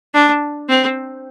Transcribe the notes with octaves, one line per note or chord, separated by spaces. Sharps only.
D4
C4